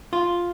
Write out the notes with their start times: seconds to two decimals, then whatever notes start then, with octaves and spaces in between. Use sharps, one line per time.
0.13 F4